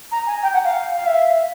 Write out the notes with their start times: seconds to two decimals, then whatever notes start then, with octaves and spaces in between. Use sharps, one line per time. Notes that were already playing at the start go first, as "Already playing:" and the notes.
0.12 A#5
0.27 G#5
0.43 G5
0.54 F#5
0.65 F5
0.95 F5
1.07 E5